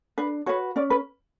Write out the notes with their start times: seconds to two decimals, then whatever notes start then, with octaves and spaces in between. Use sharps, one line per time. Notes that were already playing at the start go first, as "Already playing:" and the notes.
0.18 D4 B4
0.46 F#4 B4 C#5
0.76 C#4 D5
0.90 B4